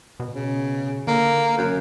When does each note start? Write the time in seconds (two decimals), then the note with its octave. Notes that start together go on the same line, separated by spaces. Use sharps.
0.20 B2
0.35 C#3
1.07 D3 A#3
1.57 F#2